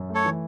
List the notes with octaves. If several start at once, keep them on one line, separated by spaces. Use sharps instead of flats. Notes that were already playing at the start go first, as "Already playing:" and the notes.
Already playing: F#2
A3
A4 C#5
E3